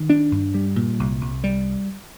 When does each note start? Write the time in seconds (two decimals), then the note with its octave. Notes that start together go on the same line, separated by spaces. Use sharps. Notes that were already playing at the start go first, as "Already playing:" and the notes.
Already playing: D#3
0.10 D4
0.32 G2
0.54 G3
0.76 A#2
0.99 C2
1.21 C2
1.44 G3